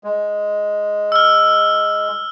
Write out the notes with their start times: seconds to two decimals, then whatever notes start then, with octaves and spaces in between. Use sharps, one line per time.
0.04 G#3
1.12 E6 F6